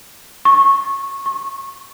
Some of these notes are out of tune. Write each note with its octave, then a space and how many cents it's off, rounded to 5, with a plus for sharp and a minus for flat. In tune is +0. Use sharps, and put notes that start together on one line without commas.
C#6 -15
C#6 -25